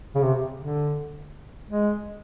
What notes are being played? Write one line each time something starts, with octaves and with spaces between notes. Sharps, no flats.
C#3
C3
D3
G#3